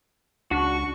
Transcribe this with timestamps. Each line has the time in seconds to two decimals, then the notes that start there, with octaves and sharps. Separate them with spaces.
0.51 C#2 D4 F#4 C#6